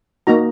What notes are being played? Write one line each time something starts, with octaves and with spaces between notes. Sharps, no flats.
A#3 D#4 F#4 A#5